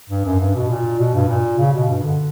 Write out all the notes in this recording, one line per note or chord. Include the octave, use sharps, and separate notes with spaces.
G2
F#2
G2
B2
A#2
B2
G2
A#2
C#3
B2
G2
D3